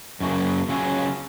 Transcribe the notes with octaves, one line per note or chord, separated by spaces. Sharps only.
F#2 C#3 F#3 A#3
C#3 F#3 C#4 F4